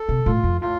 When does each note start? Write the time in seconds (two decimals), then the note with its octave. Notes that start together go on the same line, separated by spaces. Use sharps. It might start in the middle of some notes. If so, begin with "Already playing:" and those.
Already playing: A4
0.09 C3
0.26 A2 F4
0.44 F2
0.61 A2 F4